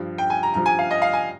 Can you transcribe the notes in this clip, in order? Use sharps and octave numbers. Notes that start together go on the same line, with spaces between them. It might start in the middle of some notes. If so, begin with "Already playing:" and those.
Already playing: G2 F3
G5
G#5
A#5
G2 F3 A#5
G#5
F5
D#5
F5
G#5